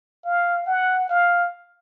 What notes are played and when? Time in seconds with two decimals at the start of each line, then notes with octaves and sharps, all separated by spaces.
0.24 F5
0.66 F#5
1.09 F5